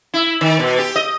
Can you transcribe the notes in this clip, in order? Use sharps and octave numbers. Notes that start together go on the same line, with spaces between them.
E4
D#3
B2
G4
D#5